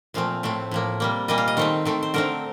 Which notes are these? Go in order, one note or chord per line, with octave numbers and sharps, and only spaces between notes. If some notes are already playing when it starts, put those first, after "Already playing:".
A#2 F3 A3 C4 F5
A2 A3 C4
A2 F3 A#3
C3 G3 A#3
A#2 G3 A#3 D#5
F5
D#5
D#3 A3 C4 C5
D#3 A3 C4
C5
D3 A3 C4 A#4